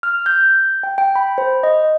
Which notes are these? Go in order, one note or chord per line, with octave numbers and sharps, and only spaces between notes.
F6
G6
G5
G5
B5
C5
D#5